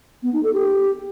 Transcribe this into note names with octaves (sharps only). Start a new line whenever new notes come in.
B3
D#4
A4
G4